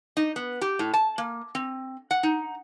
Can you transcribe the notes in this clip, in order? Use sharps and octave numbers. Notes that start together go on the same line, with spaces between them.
D#4
B3
G4
A2
A5
A#3
C4
F#5
D#4